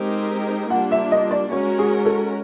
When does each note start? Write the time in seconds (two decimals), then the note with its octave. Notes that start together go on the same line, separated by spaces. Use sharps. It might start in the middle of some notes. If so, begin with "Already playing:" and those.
Already playing: G#3 C4 D#4 G4 A#4
0.70 G3 A#3 D4 F4 F#5
0.91 E5
1.12 D#5
1.31 D5
1.52 G#3 C#4 F#4 A#4 C#5
1.79 G#4
2.05 A4